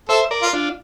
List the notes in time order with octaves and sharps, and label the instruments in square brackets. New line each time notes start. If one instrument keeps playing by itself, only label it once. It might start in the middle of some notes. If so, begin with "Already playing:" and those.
[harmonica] A4 [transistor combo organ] C5 E5
[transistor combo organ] A#4 D5
[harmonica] F4
[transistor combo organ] D4 F4